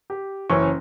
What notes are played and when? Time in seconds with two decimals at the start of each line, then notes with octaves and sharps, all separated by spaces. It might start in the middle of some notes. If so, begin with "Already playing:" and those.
0.10 G4
0.50 F#1 E3 C#4 C#6